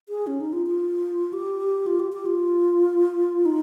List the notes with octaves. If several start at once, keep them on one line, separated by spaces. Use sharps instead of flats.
G#4
C#4
D#4
F4
F4
G4
F4
G4
G4
F4
D#4